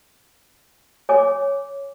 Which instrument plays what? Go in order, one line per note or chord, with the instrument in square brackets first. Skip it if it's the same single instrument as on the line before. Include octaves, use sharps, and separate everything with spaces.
[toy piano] C#5 G#5 D6